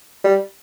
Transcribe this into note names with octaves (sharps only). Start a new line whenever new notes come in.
G3